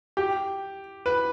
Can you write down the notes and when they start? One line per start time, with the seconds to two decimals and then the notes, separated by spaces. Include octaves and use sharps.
0.17 G4
1.06 B4